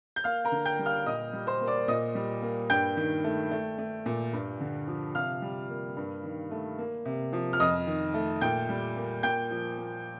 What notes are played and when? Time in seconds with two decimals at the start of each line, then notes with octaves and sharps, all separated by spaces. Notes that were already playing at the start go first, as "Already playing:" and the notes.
0.16 G6
0.24 A#3 F5 F6
0.45 A#4 A#5
0.52 D3
0.65 G5 G6
0.79 G3
0.86 F5 F6
1.06 A#2 D#5 D#6
1.33 G3
1.47 C5 C6
1.61 A#3
1.67 D5 D6
1.88 A#2 D#5 D#6
2.15 G3
2.42 A#3
2.70 G2 G5 G6
2.97 D#3
3.24 A3
3.51 A3
3.78 A3
4.06 A#2
4.33 G2
4.61 D3
4.88 F3
5.15 C3 F5 F6
5.42 G3
5.69 A#3
5.97 G2
6.24 D#3
6.51 A3
6.79 A#3
7.05 C3
7.33 F3
7.53 F6
7.60 F2 D#5 D#6
7.87 D#3
8.14 A3
8.41 A#2 G5 G6
8.69 G3
8.96 A#3
9.23 A#2 G5 G6
9.51 F3
9.78 A#3